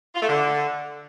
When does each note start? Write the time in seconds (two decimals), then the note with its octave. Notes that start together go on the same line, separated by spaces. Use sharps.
0.15 F4
0.21 A3
0.28 D3